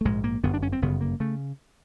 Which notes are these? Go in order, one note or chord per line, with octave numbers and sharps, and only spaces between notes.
A3
A#1 G#2 G#3
A#3
G1 F#2 D3 B3
D4
C#4
C4
G1 F#2 C#3 B3
A#3
C#3 A3